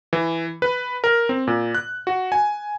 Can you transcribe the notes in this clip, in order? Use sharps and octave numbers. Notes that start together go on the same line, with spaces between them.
E3
B4
A#4
C4
A#2
F#6
F#4
G#5